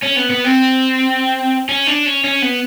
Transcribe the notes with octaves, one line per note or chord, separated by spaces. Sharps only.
C#4
B3
B3
C4
C#4
D4
C#4
C#4
B3